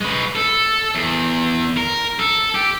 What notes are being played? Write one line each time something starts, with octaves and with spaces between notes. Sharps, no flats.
G#3 B4
A4
E2
A#4
A4
G4